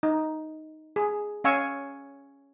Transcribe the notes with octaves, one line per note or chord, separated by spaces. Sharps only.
D#4
G#4
C#4 F5 G#5 C#6 E6